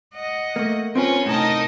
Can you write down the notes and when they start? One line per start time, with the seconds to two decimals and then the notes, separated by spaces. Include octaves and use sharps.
0.15 D#5 F#5
0.56 A3 A#3
0.95 C4 C#4 F4 A#4 B4 G#5
1.26 A2 C3 D#4 A#4 D#5 A5